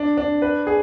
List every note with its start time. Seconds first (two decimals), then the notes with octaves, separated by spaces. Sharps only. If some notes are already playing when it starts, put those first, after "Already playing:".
Already playing: D4
0.18 D4
0.42 B4
0.67 G#4